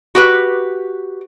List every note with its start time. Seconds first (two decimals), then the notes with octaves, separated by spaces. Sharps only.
0.15 F#4 G4 B4